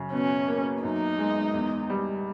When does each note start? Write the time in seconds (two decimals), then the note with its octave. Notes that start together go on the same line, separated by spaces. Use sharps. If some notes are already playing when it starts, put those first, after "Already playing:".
Already playing: F#2 C#3
0.13 B2 C#4
0.48 A#3
0.83 F#2 D#4
1.19 G#3
1.54 E2
1.90 G3